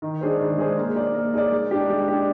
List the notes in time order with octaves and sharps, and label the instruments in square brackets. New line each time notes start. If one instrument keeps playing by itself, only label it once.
[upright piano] D#3
G#3 D4 G#4 C5
D#3
G#3 D4 G#4 C5
A#3
D#4 G#4 D5
A#3
D#4 G#4 D5
G#3
D4 G4
G#3
D4 G4